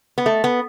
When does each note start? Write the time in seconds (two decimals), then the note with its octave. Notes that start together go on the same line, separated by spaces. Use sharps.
0.18 B3
0.26 A3
0.44 B3